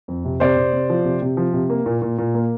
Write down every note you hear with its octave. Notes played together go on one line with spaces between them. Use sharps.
F2
C3
C3 C5 D5
C3
C3
F3
C3
C3
F3
C3
A#3
A#2
A#2
A#2
A#3